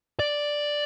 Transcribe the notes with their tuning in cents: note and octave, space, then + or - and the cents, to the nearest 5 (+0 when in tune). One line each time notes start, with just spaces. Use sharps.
D5 +0